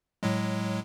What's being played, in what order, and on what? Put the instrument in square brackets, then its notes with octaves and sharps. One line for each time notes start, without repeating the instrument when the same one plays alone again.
[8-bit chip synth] A2 F#3 G#3